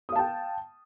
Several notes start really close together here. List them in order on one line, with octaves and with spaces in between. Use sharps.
D#6 F5 A5 G5